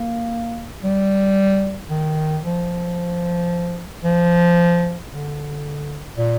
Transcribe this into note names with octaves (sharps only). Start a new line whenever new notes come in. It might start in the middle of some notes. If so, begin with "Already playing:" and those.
Already playing: A#3
G3
D#3
F3
F3
D3
A#2